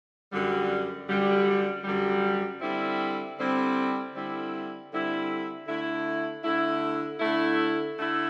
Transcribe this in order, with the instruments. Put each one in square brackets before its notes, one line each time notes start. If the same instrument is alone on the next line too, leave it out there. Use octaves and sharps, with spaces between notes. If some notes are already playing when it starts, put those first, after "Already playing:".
[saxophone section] F#2 D3 G3
F#2 D3 G3
F#2 D3 G3
D3 G3 C4 E4
D3 G3 C4 E4
D3 G3 C4 E4
D3 G3 C4 E4
D3 A3 E4
D3 A3 E4
D3 A3 E4
D3 A3 E4